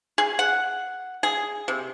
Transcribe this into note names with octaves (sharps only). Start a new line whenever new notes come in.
G#4
F#5
G#4
C3